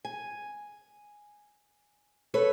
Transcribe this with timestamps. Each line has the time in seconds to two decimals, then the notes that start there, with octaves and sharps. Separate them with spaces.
0.05 G#5
2.34 A4 B4 C#5